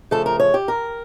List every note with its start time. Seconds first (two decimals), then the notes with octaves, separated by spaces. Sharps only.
0.11 C#3 F3 A3 A4
0.26 A#4
0.40 C#5
0.54 G4
0.68 A#4